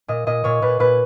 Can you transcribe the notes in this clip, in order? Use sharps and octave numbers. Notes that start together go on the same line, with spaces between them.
A#2 D#5
A#2 D#5
A#2 C#5
A#2 B4
A#2 B4